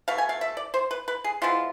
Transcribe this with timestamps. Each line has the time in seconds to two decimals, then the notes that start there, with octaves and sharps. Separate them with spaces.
0.08 B2 A3 F5
0.18 G#5
0.29 F5
0.41 E5
0.57 D5
0.74 C5
0.91 B4
1.08 B4
1.24 G#4
1.42 F3 G#3 B3 E4 F4